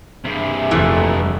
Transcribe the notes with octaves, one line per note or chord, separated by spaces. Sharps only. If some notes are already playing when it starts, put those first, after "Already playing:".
G2 C3 A#3 G#4 E5
F1 A#2 E3 A3